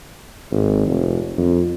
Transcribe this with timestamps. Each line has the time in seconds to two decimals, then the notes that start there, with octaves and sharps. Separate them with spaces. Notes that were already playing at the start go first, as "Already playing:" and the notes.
0.51 G#1
0.87 F1
1.38 F2